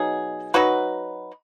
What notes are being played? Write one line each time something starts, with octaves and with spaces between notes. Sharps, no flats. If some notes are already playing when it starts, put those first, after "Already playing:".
Already playing: B2 F#3 D#4 G#4
F#3 D#4 F#4 B4